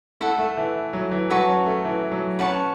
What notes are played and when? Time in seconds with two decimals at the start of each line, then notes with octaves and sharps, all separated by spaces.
0.21 A3 E4 A4 F#5
0.39 A3
0.57 E3
0.93 F#3
1.11 E3
1.30 F#3 F#4 B4 A5 C#6
1.48 C#4
1.66 A3
1.85 E3
2.11 F#3
2.39 C#4 B4 F#5 A5 C#6